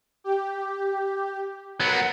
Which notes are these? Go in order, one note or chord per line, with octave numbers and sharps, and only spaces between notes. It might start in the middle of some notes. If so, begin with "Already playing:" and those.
G4
F#3 B3 A#4 F#5